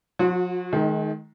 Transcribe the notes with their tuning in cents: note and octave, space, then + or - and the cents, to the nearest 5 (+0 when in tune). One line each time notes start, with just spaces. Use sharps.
F3 +45 F#4 -25 C6 +0
D#3 +0 G#3 +35 D#4 +15